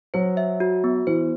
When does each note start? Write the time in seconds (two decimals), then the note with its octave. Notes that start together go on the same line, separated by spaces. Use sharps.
0.14 F#3 C5
0.37 E5
0.60 F#4
0.84 B3
1.07 E3 C5